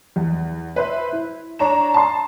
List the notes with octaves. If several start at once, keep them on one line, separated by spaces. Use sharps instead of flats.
E2
B4 C5 E5
E4
D4 C#5 A#5 E7
A5 C6